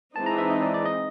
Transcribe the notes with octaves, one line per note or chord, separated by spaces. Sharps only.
E3 G#3 C4 D#4 A5
A#5
E5
D#5
D5
D5
D#5